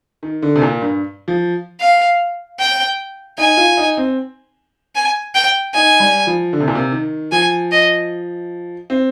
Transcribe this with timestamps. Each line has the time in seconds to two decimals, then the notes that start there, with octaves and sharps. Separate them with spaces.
0.23 D#3
0.42 D3
0.56 C3
0.62 A#2
0.82 G2
1.28 F3
1.80 F5
2.59 G5
3.38 D#4 G#5
3.57 F4
3.77 D#4
3.97 C4
4.95 G#5
5.34 G5
5.74 D#4 G#5
6.00 G3
6.27 F3
6.53 D3
6.60 C3
6.68 A#2
6.75 C3
6.92 D#3
7.32 F3 G#5
7.72 D#5
8.90 C4